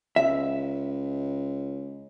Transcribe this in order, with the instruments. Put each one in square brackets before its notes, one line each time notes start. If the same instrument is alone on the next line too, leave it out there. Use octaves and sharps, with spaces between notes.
[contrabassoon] C#2 [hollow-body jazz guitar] E5